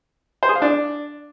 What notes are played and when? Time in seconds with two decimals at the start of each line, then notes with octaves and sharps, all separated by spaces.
0.43 C5
0.49 G#4
0.55 F5
0.62 D4